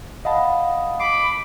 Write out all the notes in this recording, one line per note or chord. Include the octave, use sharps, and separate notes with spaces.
D#5 F5 F#5 A5 B5
B5 D6 C7